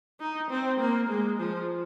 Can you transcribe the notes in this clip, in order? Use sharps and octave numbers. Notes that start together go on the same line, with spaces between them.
D#4
C4
A#3
G#3
F3